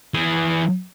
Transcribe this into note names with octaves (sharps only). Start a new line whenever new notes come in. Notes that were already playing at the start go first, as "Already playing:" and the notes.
E3 G#4